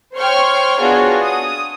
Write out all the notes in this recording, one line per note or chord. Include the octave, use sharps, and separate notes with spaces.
C5 C#5 G5 C#6 F6
B3 D4 F4 F#4 G#4 C#5
D#6